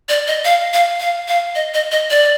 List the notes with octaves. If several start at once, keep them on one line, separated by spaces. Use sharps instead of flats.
D5
D#5
F5
F5
F5
F5
D#5
D#5
D#5
D5